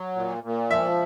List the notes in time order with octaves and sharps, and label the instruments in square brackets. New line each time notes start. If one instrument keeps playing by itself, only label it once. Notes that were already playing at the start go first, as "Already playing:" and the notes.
Already playing: [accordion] F#3
A#2
A#2
[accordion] F3 [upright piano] E5